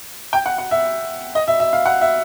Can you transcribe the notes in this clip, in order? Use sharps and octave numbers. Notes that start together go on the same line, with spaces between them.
G5
F#5
F#5
E5
D#5
E5
E5
F5
F#5
E5